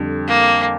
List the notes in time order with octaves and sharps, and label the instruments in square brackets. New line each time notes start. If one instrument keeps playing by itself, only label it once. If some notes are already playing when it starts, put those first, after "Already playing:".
Already playing: [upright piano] F2 D3 G3
[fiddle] A#3